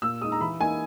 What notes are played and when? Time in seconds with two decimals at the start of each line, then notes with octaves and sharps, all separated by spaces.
0.02 A#2 E6
0.21 G#3 D#4 D#6
0.32 A#5
0.40 E3 B5
0.60 A#3 D#4 G#5